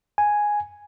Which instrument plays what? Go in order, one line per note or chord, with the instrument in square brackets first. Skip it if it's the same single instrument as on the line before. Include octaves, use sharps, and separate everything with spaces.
[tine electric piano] G#5